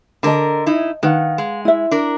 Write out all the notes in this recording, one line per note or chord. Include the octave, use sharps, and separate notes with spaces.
D3 A#4 D#5 A5 A#5
D#4 E4
D#3 B4 F5 F#5
G#3
E4 E5
D4 A#4